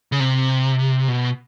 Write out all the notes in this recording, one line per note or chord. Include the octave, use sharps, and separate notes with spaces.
C#3
C3
B2